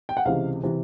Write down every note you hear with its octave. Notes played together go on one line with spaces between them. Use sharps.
G5
F#5
C#2 C3 E3 F5
C3 E3